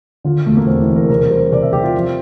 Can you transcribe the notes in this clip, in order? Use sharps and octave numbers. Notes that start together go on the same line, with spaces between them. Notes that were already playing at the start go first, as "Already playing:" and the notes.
D3 F4
E1 A3
A#3
E2 C4
E4
E2
A#4
C3 A#4
G3 C5
C3 D5
E5
C3 G4
F4
F3